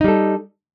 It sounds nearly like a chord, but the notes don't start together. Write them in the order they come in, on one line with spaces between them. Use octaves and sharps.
D#4 G3 A4